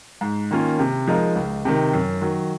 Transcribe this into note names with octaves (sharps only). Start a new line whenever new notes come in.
G#2
D#3 A#3 C#4 F4
C3
F3 G#3 D#4 A#4
C#2
C3 D#3
F#2
D#3 F#3